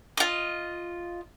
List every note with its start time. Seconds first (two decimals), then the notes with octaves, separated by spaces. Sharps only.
0.17 F4 D#5